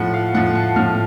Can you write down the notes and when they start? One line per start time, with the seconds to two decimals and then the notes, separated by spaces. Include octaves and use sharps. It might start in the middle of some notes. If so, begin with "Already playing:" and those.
Already playing: A2 F3 F#5
0.14 F5
0.34 A2 F3 F#5
0.55 A5
0.76 A2 F3 F6